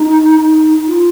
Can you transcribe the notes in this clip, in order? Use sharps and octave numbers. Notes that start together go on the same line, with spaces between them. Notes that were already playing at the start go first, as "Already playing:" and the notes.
Already playing: D#4
F4